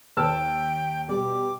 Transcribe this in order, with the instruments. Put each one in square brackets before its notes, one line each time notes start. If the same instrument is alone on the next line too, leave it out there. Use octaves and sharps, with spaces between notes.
[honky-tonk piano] D#2 [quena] G5 [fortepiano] A5 E6 F6
[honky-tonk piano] B2 G3 [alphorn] G4 [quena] D6